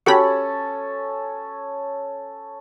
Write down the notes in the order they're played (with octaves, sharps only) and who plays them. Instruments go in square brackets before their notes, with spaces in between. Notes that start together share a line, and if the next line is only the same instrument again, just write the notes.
[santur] C#4 A4 [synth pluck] F#4 G4 B5